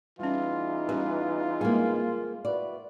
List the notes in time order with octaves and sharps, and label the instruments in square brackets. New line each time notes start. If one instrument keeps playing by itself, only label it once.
[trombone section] E2 E3 D#4 [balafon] G3 C#4 [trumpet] F4
[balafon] G3 C#4 G4 [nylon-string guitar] B4
[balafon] G3 G#3 [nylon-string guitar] A#3 C4 G#4
[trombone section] E4 F#4 B4 [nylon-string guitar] D5